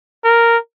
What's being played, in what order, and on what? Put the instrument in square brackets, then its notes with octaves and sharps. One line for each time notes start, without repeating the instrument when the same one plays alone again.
[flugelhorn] A#4